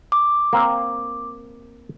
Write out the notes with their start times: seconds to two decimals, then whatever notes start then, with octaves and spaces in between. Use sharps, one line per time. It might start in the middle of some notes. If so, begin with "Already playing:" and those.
0.12 D6
0.53 A#3 C4